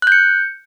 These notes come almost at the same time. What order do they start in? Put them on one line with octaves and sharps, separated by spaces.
F#6 G6 C#7